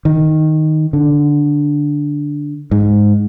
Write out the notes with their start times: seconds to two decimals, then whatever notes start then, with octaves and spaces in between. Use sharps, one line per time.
0.05 D#3
0.93 D3
2.71 G#2